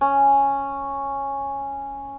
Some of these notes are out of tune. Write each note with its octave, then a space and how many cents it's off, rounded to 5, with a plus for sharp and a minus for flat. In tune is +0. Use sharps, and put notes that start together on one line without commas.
C#4 -5